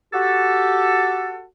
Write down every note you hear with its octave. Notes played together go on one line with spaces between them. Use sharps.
F#4 G4 A4